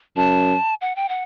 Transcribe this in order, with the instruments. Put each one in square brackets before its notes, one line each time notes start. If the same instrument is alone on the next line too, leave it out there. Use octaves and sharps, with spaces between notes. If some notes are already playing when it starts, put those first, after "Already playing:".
[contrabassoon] F#2 [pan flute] A5
[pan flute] F#5
G5
F#5